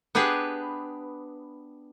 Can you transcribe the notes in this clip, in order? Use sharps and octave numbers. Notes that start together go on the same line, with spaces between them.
B3 D4 G4 G#4 B4